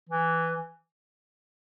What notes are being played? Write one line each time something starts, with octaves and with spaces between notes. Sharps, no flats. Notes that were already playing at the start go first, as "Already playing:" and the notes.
E3